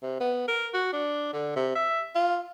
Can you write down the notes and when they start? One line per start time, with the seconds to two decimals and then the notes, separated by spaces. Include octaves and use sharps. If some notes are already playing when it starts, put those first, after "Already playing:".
0.03 C3
0.20 B3
0.48 A#4
0.74 F#4
0.93 D4
1.33 D3
1.56 C3
1.75 E5
2.15 F4